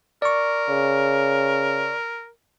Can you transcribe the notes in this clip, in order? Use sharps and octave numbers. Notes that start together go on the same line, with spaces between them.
A#4 D5 C#6
C#3